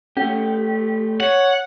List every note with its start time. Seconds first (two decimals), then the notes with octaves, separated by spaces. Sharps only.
0.17 A3 C#4 G4 A4 F#5
1.20 C#5 F#5